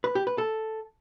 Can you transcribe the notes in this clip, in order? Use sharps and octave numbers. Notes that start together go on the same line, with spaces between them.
B4
G4
B4
A4